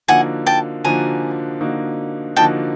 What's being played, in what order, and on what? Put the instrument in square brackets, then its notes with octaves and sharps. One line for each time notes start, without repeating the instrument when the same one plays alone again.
[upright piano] D3 F3 A#3 D#4 F#4 [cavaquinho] F#5 G#5
[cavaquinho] G5 A5
[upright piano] D3 F3 A#3 D#4 F#4 [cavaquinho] G#5 A#5
[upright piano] D3 F3 A#3 D#4 F#4
[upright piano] D3 F3 A#3 D#4 F#4 [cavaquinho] G5 A5